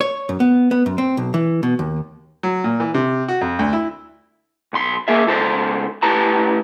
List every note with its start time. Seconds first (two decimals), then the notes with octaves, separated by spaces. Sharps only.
0.01 C#5
0.29 F#2
0.40 B3
0.71 B3
0.86 F#2
0.98 C4
1.17 B1
1.34 E3
1.63 B2
1.79 D#2
2.43 F#3
2.64 A#2
2.80 E3
2.94 C3
3.28 F#4
3.41 F2
3.59 D2
3.73 E4
4.73 B1 C6
5.08 A#3 G#4 E5
5.27 C#2 A4 C5
6.03 A2 G4 B4 A5 A#5